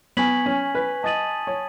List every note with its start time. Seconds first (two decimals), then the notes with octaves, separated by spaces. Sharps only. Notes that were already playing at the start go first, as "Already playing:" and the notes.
0.17 B3 G#5 C#6 G#6 B6 F#7
0.46 C#4
0.75 B4
1.03 D#5 A5 D#6 A6 D#7 F#7
1.47 C#5